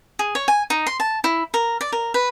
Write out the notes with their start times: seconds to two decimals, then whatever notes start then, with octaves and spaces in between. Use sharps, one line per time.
0.19 G#4
0.35 C#5
0.48 G#5
0.70 D#4
0.87 C6
1.00 A5
1.24 E4
1.54 A#4
1.81 D5
1.92 A#4
2.14 B4